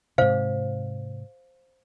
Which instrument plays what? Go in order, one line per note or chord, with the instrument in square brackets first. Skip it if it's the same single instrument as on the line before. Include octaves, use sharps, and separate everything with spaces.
[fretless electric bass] G#2 C3 [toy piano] C5 F5